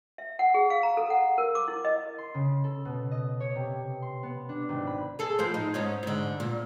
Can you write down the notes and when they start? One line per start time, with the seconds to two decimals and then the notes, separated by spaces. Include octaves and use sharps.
0.18 E5
0.39 F#5
0.54 G#4
0.70 F5
0.83 A#5
0.97 A4
1.10 F#5
1.38 A#4
1.55 D6
1.68 E4
1.85 D#5
2.18 C6
2.34 C#3
2.64 A4
2.85 B2
3.11 D#5
3.40 C#5
3.55 C3
4.02 C6
4.23 B3
4.49 D4
4.69 G#1
4.87 B5
5.19 G#4 A4
5.39 A2 F3 C5
5.54 D#4
5.74 G#2 C#4 D#4
6.03 G#2 D3
6.40 A#2